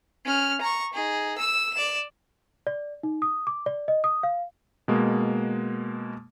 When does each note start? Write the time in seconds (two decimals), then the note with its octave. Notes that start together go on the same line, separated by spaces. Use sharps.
0.25 C#4 F6
0.61 A#5 C#6
0.93 D#4 G#4
1.38 E6 E7
1.73 D5 E7
2.67 D5
3.03 D#4
3.22 D#6
3.47 D6
3.66 D5
3.88 D#5
4.04 D#6
4.23 F5
4.88 B2 G#3 A#3